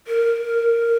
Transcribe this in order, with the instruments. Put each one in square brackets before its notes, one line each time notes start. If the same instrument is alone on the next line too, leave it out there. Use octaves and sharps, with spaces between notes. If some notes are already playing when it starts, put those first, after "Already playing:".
[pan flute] A#4